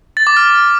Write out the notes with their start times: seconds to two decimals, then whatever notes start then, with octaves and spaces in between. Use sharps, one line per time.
0.17 A6
0.27 D6
0.37 F6